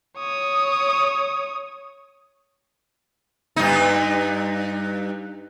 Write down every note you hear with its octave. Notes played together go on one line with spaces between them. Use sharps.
C#5 D#6
G2 D#4